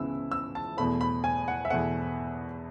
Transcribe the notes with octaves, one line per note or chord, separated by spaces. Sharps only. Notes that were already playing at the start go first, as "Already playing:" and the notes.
Already playing: C#2 C#3 E3 B3 E4 E6
E6
A5
E2 B2 A3 B5
B5
G#5
F#5
E5
E2 B2 A3 F#5